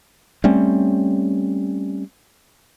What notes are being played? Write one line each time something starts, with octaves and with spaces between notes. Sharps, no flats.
G3 A3 C4 C#4